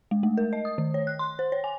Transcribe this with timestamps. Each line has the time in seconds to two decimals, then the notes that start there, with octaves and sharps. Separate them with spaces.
0.11 G#3
0.23 A3
0.37 A#4
0.53 D#5
0.65 D#6
0.78 D#3
0.94 C#5
1.07 F#6
1.19 C6
1.39 C5
1.52 C#5
1.64 G#5